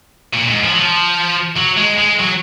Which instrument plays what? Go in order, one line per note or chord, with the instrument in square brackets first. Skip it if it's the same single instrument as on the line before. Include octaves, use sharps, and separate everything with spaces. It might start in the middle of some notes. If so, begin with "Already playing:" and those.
[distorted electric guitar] A#2
G#2
F3
F#3
F3
F#3
G#3
G#3
F#3